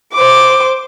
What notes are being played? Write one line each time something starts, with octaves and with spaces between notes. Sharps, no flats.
C5 D6